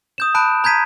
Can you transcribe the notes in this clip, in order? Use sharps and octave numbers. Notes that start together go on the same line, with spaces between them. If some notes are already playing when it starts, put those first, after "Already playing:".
D#6 G6 E7
A5 B5 F#6 D7
A#5 G6 G#6 B6 D#7